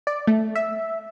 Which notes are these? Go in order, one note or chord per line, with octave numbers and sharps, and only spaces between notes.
D5
A3
E5